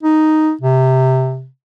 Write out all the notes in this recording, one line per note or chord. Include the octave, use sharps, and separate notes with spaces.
D#4
C3